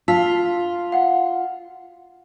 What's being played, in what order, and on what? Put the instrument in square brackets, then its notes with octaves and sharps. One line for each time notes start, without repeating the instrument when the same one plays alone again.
[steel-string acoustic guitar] F4 [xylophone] A5 E6 B6
[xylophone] F5 F#5